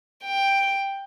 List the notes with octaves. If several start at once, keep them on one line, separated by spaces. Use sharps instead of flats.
G5